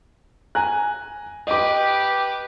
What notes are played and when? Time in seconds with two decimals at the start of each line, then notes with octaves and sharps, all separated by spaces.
0.55 G#5 A#5 F#6
1.47 G4 B4 D#5 D6